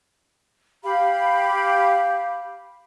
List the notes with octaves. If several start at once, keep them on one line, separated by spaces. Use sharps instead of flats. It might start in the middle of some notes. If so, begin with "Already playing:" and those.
G4 F5 B5